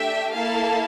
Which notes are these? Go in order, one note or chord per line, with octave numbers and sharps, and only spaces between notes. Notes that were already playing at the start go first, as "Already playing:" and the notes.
Already playing: A3 D4 G4 E5 G5
A#3 E4 A4 F5 A5